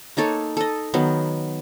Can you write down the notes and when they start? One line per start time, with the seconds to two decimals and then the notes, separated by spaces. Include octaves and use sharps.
0.17 A#3 D#4 A4 C#5
0.57 A4 D#5
0.94 D#3 F#3 B3